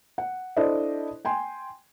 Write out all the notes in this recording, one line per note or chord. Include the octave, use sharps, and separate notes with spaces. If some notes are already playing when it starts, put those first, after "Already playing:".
F#5
D4 E4 A4 C5 D5 D#5
G5 G#5 C6